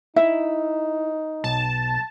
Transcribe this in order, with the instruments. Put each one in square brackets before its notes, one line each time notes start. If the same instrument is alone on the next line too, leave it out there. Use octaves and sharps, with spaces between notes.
[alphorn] D#4 [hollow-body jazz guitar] E4 [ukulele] E5
[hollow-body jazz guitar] B1 [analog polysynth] A5